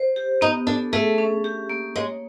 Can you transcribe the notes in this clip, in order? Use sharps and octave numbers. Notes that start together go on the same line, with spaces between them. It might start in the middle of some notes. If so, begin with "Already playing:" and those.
Already playing: C5
G4
B3 D#4
D4 A4
A3 G#4
C#4
G4
A#3
G#3 C#5